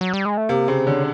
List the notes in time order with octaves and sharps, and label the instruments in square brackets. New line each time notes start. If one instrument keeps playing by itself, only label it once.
[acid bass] F#3
G3
G#3
A3
[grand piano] C3 [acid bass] A#3
[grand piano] C#3 [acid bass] C4
[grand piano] D3 [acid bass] C#4